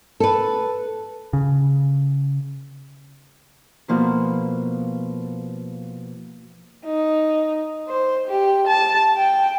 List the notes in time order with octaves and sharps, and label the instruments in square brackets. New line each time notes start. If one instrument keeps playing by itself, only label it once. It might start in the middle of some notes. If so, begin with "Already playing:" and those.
[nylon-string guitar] A4 B4
[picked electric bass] C#3
[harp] B2 F3 A#3 E4
[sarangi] D#4
C5
G4
A5
G5